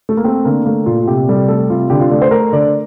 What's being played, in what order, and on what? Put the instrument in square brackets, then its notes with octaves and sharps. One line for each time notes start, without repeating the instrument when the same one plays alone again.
[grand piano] A3
A#3
A3 C4
D3 A#3
A3 A#3
A#2 F4
F4
C3 G4
G3 A4
A3 A4
C3 F4
D3 G4
F4
A3 D5
C5
A3 A#4
D3 D5